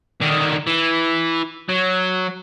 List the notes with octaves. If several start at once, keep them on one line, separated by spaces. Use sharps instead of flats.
D3 D#3
E3
F#3